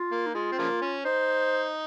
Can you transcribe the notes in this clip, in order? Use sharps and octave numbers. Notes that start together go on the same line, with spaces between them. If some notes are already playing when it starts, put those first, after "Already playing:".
Already playing: F4
A#3
D#4
G#3 F4
C4
C#3 F3 A#3
C#4
D#4 C5